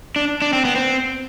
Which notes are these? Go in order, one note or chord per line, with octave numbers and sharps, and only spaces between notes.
D4
D4
C4
B3
C4